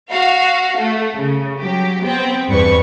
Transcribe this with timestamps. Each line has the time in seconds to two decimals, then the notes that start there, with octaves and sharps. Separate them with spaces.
0.11 F#4 F5
0.77 A3
1.15 C#3
1.59 F#3 G4
2.03 B3 C4 G5
2.48 E2 G2 B4 C#6